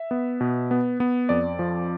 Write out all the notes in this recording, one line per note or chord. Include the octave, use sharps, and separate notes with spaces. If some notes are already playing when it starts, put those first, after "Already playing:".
Already playing: E5
B3
B2
B3
B3
F2 D5
F3